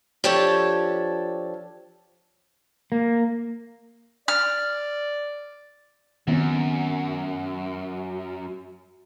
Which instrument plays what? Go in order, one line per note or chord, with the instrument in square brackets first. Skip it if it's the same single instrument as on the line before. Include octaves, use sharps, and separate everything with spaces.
[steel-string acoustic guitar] F3 D4 G4 A4 C#5
[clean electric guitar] A#3
[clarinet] D5 [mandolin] F6
[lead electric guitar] F#2 [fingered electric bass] D#3 B3 C4